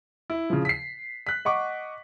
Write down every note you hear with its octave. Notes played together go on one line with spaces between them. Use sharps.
E4
C#3 F3
B6 C7
F#6 B6
D#5 F#5 C#6 D6